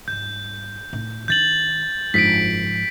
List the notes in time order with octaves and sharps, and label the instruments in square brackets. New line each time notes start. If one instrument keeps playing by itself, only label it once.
[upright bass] G#2 G3 [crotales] G6
[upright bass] A2 D#4
[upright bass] D#3 D4 [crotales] G6 A6 F#7
[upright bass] F#1 D4 [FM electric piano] G#2 F3 [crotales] B6 C7 D7